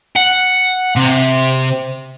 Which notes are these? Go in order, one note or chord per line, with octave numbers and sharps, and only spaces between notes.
F#5
C3